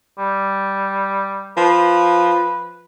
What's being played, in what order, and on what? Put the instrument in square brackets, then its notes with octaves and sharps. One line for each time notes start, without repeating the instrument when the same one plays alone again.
[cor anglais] G3
[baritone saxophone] F3 [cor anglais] B4